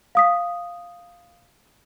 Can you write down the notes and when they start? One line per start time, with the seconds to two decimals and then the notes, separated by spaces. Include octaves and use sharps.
0.15 F5 D#6 B6